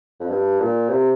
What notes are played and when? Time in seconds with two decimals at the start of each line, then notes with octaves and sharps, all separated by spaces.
0.20 F2
0.29 G2
0.60 A#2
0.89 C3